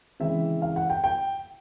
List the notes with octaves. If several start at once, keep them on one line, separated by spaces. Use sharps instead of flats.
C#3 E3 G#3 C4 E5
F5
F#5
G5
G5